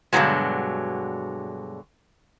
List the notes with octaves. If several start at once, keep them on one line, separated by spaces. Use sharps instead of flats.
G2 B2 D3 D#3 F#3 G#3